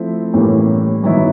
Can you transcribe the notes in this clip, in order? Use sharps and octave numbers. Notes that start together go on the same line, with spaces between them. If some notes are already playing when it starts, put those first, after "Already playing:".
Already playing: F3 A3 C4 E4
A2 E3 G3 A#3 C#4
G2 D#3 F#3 B3 E4